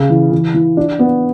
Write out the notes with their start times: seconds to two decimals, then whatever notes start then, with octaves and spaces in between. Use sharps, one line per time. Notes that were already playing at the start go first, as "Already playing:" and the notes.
Already playing: C#3
0.10 E3
0.32 E3
0.54 E3
0.77 D4
0.99 B3